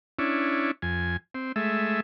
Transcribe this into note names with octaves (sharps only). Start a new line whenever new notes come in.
C#4 D4 E4
F2 G#5
C4
G#3 A3 E5